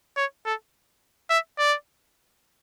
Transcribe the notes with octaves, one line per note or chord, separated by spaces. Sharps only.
C#5
A4
E5
D5